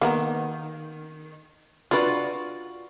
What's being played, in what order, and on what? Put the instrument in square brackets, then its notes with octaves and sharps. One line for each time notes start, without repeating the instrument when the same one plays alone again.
[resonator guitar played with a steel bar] D#3 [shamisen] A#3 B3 A#4
[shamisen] D4 B4 [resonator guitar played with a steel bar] F4 F#4 D5